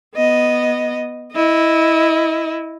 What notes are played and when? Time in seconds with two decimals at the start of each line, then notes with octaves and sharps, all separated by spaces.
0.16 B3 D#5
1.32 E4 D#5